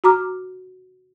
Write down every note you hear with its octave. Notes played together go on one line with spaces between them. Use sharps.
F#4 A#5 D6 F6